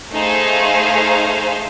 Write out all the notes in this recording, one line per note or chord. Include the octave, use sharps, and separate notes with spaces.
A3 D#4 G#4 C5 F5